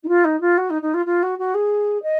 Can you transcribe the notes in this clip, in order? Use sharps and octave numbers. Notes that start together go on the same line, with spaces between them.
D#4
F4
D#4
F4
F#4
D#4
D#4
F4
F4
F#4
F#4
G#4
D#5